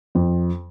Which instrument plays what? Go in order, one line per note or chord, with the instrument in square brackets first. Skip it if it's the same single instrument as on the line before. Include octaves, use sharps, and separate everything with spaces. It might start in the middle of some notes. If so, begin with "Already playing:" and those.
[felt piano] F2